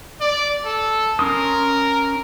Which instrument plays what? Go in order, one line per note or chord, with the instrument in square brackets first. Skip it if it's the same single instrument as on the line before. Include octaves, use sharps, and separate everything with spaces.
[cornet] D5
A4
[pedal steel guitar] C#4 C6 D#6 [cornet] A#4